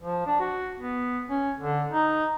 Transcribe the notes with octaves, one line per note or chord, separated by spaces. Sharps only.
F3
D4
F#4
B3
C#4
D3
D#4